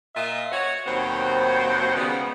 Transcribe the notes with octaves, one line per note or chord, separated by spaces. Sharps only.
A#2 F4 D#5 E5
F#4 C#5
D#2 B2 F#3 C4 C5 F#5
C#3 G3 G#3 B3